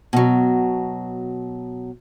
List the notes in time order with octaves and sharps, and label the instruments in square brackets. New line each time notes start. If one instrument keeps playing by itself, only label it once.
[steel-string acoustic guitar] B2 F#3